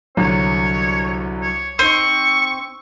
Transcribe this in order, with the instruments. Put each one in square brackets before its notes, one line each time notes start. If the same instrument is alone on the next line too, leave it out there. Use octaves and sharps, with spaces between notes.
[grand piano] C2 D3 F#3 [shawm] C#5
[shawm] C#5
[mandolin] C4 [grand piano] D#4 D#7 [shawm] C#6